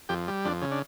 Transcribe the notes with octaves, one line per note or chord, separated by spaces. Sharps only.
F2 G4
G3
F2 D4
C#3
D4